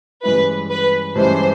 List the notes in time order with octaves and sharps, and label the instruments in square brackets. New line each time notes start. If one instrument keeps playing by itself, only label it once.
[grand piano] G2 E3 G#3 C#4 E4 [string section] B4
[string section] B4
[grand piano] G2 E3 G#3 C#4 E4 [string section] C5